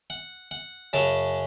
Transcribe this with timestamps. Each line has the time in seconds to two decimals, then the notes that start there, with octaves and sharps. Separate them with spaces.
0.10 F#5
0.51 F#5
0.93 F#2 C#3 F#3 A5